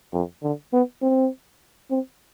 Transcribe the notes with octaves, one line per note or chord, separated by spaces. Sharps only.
F2
D3
B3
C4
C4